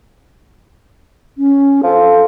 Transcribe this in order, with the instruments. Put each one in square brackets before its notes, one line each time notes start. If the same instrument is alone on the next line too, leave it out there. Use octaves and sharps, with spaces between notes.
[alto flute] C#4
[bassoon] F3 [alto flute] A4